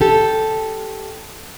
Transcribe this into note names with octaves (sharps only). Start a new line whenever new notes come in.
G4 A4